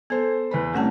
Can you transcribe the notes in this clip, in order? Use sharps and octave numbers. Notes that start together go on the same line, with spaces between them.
B3 A4 C5
E2 B4 B5
C2 A3 C#4 F#5 A5